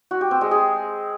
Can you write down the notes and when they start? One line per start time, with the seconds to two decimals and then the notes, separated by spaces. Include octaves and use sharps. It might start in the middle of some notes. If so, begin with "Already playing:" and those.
0.11 F#4
0.21 G4
0.31 C4
0.41 G#3
0.51 G#4